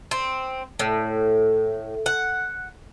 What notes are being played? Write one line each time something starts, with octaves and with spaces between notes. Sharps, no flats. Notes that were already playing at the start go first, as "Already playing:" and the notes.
C4
A2
F#5